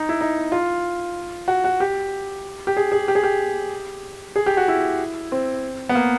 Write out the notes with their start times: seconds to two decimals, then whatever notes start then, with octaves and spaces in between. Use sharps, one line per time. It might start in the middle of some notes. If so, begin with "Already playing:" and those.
Already playing: D#4
0.09 E4
0.21 D#4
0.52 F4
1.48 F#4
1.64 F#4
1.80 G4
2.67 G4
2.77 G#4
2.92 G#4
3.08 G4
3.15 G#4
3.23 G4
4.36 G#4
4.46 G4
4.57 F#4
4.68 E4
5.32 C4
5.89 B3
5.95 A#3